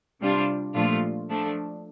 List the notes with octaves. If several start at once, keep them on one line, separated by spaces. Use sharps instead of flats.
C3 G3 D4 F4
A#2 F3 A3 D4 F4
F3 A3 D4